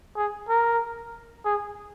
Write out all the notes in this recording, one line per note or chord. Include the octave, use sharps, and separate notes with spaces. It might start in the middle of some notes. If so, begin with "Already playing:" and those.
G#4
A#4
G#4